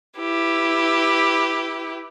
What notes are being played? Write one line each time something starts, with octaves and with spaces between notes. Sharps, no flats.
E4 G4 B4